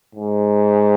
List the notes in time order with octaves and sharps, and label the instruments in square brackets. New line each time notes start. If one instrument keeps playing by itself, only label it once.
[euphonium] G#2